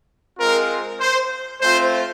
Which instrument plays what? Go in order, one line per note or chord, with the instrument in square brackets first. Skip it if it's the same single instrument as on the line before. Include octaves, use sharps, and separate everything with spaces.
[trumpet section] G#3 C4 F4 A#4
C5
A3 C4 F4 C5